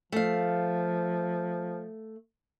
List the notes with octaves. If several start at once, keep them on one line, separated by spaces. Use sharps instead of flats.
F3 A3 F5